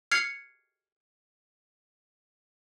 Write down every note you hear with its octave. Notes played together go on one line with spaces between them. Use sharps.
F6 G#6 C7 C#7 F7